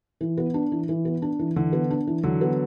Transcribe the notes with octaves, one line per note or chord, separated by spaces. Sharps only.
E3
B3
D4
E3
E3
B3
D4
E3
D3 E3
B3
D4
E3
D3 E3 F#3
B3